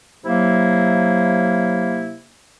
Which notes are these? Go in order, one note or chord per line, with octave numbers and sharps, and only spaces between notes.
C3 F#3 A#3 E4